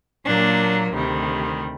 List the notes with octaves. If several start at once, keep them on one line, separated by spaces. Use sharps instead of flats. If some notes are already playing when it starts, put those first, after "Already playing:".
A#2 F#3 A#3 D4
D2 C3 D#3 G3